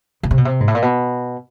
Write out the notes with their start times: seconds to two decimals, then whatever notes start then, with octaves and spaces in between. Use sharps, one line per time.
0.23 C#3
0.31 C3
0.38 B2
0.45 C3
0.60 G#2
0.68 A2
0.75 A#2
0.82 B2